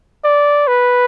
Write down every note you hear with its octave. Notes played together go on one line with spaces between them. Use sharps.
D5
B4